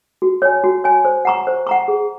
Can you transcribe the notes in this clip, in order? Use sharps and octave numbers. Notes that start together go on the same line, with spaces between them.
F#4
C#5 G#5
F#4
C#5 G#5
C5
F#5 A#5 C#6
C5
F#5 A#5 C#6
G#4